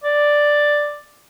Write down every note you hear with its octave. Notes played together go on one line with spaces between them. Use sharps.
D5